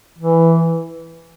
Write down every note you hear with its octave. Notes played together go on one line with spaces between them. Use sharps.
E3